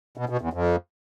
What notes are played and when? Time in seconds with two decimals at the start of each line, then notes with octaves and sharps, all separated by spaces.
0.17 B2
0.29 B2
0.41 E2
0.53 F2